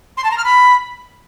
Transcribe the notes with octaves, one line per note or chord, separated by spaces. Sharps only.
C6
A5
A#5
F6
B5